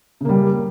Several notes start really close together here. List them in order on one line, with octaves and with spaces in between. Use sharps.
C#3 A#3 G3